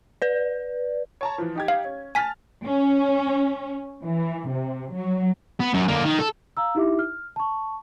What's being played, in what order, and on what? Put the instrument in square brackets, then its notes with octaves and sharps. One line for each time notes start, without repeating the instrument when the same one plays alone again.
[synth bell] B4 D5
[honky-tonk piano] C#5 A5 A#5
E3 F3
D#4 G4 G#6
[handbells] F5
[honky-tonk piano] C#4
[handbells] G#5 B6 [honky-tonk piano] A5 F6 A6
[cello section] C#4
E3
C3
F#3
[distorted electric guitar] B3
F#2
D3 A#3
D#3
A4
[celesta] F5 A#5 E6
D#4 E4 G4 E5 D6
F6
A5 C#6